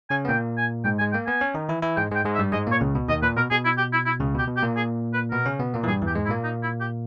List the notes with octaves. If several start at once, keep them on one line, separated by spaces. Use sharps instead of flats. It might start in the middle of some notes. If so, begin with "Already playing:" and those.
C#3 C#4 G#5
B3
A#2 A#3 G5
G#5
G#2 G#3 G5
G#3 G#5
A#3 G5
B3 G#5
C#4
D#3 D#4
E3 E4
E3 E4
G#2 G#3 G5
G#2 G#3 G5
G#2 G#3
E5
G2 G3
G#2 G#3 D#5
A#2 A#3 C#5
C#2 C#3
B2
D#2 D#3 D#5
A#2 B4
B2 A#4
B2 G#4
E4
G4
E4
E4
C#2 C#3
B2
G4
B2
G4
A#2 A#3
G#4
B4
B2 B3 A#4
C#3 C#4
B2 B3
A#2 A#3
E3
G2 G3 G#4
E2 E3 G4
G#2 G#3
E4
A#2 A#3
D#4
E4
G4